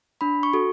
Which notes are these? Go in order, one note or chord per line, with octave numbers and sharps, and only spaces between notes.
D4 B5
C#6
F#4 A4